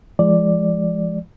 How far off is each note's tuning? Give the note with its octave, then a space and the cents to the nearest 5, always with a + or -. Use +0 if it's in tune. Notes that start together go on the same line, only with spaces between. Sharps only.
F3 -30 G#3 +0 D5 +0